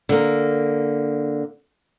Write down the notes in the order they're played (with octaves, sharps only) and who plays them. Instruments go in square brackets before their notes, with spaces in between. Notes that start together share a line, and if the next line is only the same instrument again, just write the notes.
[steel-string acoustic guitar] D3 A#3